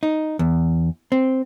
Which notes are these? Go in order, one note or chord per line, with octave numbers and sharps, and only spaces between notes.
D#4
E2
C4